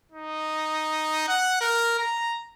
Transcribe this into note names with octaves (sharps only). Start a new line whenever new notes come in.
D#4
F#5
A#4
A#5